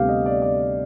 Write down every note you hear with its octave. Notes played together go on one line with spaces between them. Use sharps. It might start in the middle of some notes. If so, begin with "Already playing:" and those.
Already playing: D2 C3 G3 B3 G4 F5
D#5
D5
D5